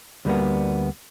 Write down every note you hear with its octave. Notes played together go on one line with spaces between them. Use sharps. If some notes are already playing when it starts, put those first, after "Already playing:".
D2 G3 A#3 B3